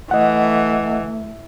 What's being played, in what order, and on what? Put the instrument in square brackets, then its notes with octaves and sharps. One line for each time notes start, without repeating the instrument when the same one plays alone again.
[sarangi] E3 [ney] A3 [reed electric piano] D#5 F#5